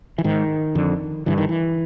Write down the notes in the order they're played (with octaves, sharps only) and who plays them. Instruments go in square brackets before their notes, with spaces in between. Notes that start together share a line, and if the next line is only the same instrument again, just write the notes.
[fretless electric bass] E3
G#2 D#3
F2 D3
G2 D3 E3
D#3
E3